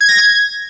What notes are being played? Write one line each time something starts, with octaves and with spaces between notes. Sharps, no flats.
G#6
A#6
G#6